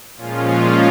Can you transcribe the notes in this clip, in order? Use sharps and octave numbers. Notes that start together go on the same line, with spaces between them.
A#2 F3 G#3 C#4 F4